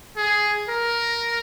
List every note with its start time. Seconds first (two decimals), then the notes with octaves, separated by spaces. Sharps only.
0.17 G#4
0.69 A#4